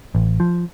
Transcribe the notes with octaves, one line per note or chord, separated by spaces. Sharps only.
A1
F3